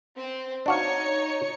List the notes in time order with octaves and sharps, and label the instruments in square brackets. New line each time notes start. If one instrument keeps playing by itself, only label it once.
[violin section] C4
[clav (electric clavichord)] D4 F#4 F5 [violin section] D#4 C#5 C#7